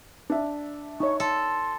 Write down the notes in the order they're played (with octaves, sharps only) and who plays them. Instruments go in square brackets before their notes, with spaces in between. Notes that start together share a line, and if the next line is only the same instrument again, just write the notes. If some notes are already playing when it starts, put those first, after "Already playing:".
[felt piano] D4 E5
[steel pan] D#4 C#5 [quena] C#6
[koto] A4 [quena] C6